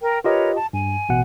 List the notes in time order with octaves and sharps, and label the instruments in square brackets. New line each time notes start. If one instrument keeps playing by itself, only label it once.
[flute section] A#4 G5
[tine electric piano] F4 G4 D#5 [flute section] A#4 B4 C#5
[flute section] A5
[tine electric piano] G2 [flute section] G#5
[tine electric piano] A1 B2 F#5